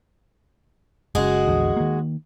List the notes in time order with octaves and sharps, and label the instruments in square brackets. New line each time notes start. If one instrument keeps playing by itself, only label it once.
[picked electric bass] F#1 C#3 [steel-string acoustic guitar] G#3 F#4 G#4
[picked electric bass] A#1 E2 D3
D#3 A#3